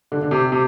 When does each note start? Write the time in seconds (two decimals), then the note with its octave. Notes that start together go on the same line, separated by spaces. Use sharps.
0.12 D3
0.22 D3
0.31 C3
0.52 C3